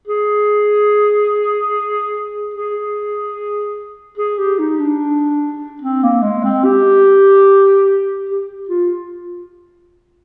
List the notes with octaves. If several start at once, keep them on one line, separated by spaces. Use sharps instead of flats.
G#4
G#4
G#4
G4
D#4
D4
C4
A#3
G#3
C4
G4
G4
F4